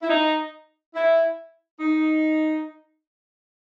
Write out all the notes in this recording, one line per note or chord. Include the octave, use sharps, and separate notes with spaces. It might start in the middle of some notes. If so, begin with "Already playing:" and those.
E4
D#4
E4
D#4